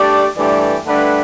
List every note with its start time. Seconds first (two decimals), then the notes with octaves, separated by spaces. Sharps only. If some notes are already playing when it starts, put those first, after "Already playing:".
Already playing: A3 D4 G4 D5
0.36 G2 E3 A3 G4 D5
0.85 G2 D3 A3 D4 B4